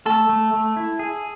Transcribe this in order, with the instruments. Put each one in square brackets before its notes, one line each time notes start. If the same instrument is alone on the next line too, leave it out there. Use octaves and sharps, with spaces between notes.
[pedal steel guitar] A3 [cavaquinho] A4
[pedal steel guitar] A3
A3
E4
G#4